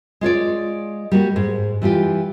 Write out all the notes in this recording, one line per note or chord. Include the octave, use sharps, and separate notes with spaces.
G#3 F4 C#5 D5
G3 A#3 F#4
G#2
E3 G3 F4 G4